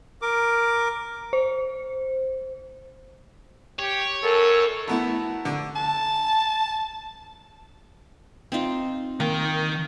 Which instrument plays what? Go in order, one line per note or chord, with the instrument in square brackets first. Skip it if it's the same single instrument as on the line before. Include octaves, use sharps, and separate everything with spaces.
[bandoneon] A#4 D6
[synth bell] C5
[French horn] G4 [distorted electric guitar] C#5
[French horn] F#2 [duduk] A4 [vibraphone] A#4
[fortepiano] A3 B3 E4 [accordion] F#4 A5 A#5
[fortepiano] D3
[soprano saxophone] A5
[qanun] C4 D#4 F4
[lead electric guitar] D#3 G5 [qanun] A#3